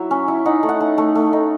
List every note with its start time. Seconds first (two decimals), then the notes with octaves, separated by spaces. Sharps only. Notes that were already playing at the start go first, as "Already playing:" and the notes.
Already playing: F#3 E4 E5
0.11 C#4
0.28 E4
0.46 D#4 F#5
0.63 A3
0.69 F#5
0.80 A3
0.98 A3
1.15 A3
1.33 D#4